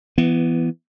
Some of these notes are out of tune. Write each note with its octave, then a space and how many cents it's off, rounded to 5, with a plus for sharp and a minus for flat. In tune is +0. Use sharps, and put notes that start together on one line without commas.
E3 +20 B3 +0